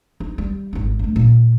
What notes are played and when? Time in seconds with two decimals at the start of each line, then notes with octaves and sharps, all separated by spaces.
0.20 D#4
0.38 G3
0.73 G#1 D#4
0.99 G2 A3
1.16 A#2